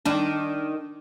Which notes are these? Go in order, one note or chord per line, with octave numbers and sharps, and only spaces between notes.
D#3 D4